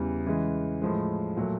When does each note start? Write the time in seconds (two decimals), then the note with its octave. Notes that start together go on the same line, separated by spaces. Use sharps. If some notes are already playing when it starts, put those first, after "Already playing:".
Already playing: E2 C#3 E3 G3
0.26 C#3 E3 G#3
0.82 A2 F3 G#3
1.37 A#2 F#3 A3